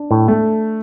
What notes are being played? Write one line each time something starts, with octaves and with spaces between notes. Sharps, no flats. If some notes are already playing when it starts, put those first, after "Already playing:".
Already playing: D4
A2
A3